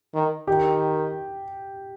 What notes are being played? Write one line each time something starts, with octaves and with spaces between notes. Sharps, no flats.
D#3
D#3 G4